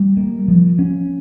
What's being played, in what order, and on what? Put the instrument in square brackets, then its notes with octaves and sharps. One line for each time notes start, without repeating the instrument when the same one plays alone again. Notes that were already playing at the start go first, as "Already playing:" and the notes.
Already playing: [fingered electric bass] G3
A#3
F3
C#4